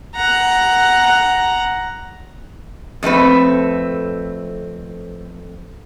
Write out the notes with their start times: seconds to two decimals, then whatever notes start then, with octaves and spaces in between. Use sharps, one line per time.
0.15 F#5 A#5
3.03 F2 A3 C4 B4